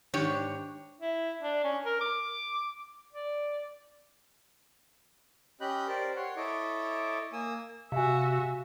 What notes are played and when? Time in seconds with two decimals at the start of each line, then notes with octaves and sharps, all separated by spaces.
0.14 G#2 D#3 D4 G4 C#5
1.01 E4
1.43 D4
1.64 C#4
1.84 A#4
2.00 D6
3.12 D5
5.61 C#4 G4 D#5 B5 F#6 G6
5.88 G4 A#4 C5 D5
6.16 C#5 F#5 C6
6.37 E4 A4 C#5 D#5 D6
7.33 A#3 G#5 D#6 E6
7.92 C3 F#4 E5 F5 G#5